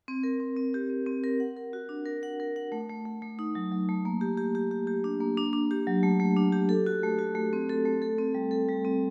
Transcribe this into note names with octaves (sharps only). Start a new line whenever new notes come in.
C4
A#4
C4
C4
G4
C4
C4
A#4
F#5
A#4
F#4
D4
A#4
F#5
A#4
F#5
A3
A3
A3
A3
D#4
F#3
F#3
A3
A#3
G4
G4
G4
G4
G4
D4
A#3
D4
D4
G4
F#3
A3
A3
D4
G4
A4
F#4
A3
F#4
A3
C4
A4
A3
A4
C4
G3
A4
G3
C4